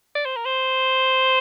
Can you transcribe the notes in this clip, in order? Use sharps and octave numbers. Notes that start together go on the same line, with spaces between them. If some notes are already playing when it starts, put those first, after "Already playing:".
D5
C5
A#4
C5